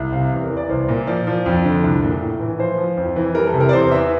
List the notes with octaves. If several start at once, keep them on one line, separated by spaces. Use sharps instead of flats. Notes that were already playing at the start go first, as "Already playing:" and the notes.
Already playing: C2
C3 F5
E2
A#4
E3
D5
C2 C5
A#2
F3 D5
F3
F2
D3
C2
A#2
A2
E3
F3 C5
F3
F2
E3
G3 A#4
A4
C3
A#4
D5
E2 C5
E3 E5